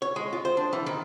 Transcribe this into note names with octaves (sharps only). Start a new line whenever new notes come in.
C#5
G#3
F4
C5
D4
E3
D#3